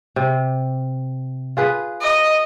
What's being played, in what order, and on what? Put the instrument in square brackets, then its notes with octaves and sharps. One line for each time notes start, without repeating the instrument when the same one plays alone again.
[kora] C3
F4 G#4 B4
[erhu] D#5